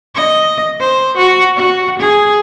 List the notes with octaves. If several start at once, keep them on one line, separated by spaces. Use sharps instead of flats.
D#5
C5
F#4
F#4
G#4